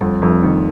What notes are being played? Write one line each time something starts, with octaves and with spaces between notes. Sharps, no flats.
F2 G3
F2 F3
D#3 G3